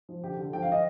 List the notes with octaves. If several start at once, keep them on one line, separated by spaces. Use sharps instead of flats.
F3
D3 G4
D3
F3 G5
F5
F3 D#5